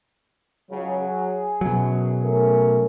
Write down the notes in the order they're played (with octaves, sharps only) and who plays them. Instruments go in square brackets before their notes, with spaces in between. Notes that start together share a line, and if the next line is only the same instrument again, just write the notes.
[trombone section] C#2 C#3 [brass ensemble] F#3
[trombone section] G#4
[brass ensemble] F#2 [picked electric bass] B2 F#3
[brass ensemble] A3 C#4 A#4